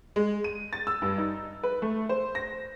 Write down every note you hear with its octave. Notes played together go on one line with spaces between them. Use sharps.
G#3
D#7
A6
E6
G2
D#4
B4
A3
C5
A#6